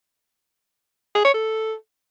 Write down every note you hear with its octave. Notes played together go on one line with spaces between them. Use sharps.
G#4
C#5
A4